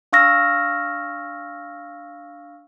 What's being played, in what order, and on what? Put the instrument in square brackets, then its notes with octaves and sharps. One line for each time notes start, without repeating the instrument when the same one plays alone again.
[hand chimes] D4 F5 C#6 E6 F6 A#6